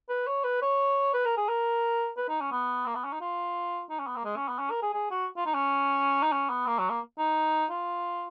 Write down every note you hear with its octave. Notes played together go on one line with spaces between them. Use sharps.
B4
C#5
B4
C#5
B4
A#4
G#4
A#4
B4
D#4
C#4
B3
A#3
B3
C#4
D#4
F4
D#4
C#4
B3
A#3
G#3
C#4
B3
C#4
A#4
G#4
G#4
F#4
F4
D#4
C#4
D#4
C#4
B3
A#3
F#3
A#3
D#4
F4